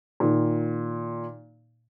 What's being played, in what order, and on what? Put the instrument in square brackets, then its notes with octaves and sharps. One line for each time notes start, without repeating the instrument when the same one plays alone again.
[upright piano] A#2 D#3